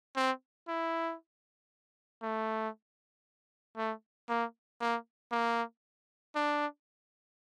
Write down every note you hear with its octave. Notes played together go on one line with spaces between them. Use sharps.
C4
E4
A3
A3
A#3
A#3
A#3
D4